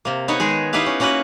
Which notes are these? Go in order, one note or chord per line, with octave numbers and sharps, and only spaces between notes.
C3 A#3
B3 D#4 C#5
D#3 G#3 G#4
B3 D#4 E4 G4 B4 F5
C#4
A#3 C#4 F#4 B4 F#5